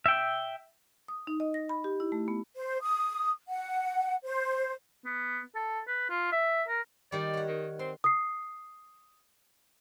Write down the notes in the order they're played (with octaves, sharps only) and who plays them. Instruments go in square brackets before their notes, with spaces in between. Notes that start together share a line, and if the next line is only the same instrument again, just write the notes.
[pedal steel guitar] E5 G5
[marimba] D#6
D#4
D#5
A#6
B5
G4
E4
A3
B3
[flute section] C5
D#6
F#5
C5
[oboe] B3
A4
B4
F4
E5
A#4
[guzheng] D#3 G3 [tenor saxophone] D5
[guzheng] C#5 F#5
[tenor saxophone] D#3
[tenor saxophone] C4 [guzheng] C6
[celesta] D#6 C7